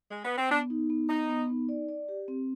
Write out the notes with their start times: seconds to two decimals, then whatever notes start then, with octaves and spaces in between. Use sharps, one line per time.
0.11 G#3
0.24 B3
0.37 C4
0.50 B3 D4
0.70 D#4
0.90 B3
1.09 B3 D#4
1.29 B3
1.49 D#4
1.69 D5
1.89 D5
2.09 G4
2.28 C4